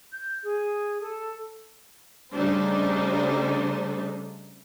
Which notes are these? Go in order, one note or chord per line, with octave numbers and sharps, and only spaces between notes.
G6
G#4
A4
C#3 G3 A3 D4 D#4 C5